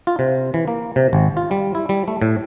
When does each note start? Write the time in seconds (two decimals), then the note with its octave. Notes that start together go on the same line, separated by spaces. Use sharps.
0.07 F4
0.19 C3
0.54 E3
0.68 A#3
0.96 C3
1.13 G#1
1.37 F4
1.51 G3
1.75 E4
1.89 G3
2.08 A3
2.22 A2